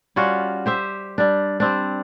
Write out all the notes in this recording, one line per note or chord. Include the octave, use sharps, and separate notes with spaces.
G3 C#4 F4 F#4
G4 C5 E5
G3 D4
G3 C4 D4